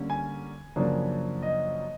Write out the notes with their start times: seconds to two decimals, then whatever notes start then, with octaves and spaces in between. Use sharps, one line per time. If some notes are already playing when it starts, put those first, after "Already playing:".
Already playing: D3 G3 A#3 C#4
0.10 G#5
0.76 F#2 C#3 F3 A#3 D4
1.42 D#5